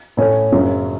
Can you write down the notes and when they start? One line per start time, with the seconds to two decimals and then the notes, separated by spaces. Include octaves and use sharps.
0.17 A2 A3 C#4
0.52 F#1 F#2 C#3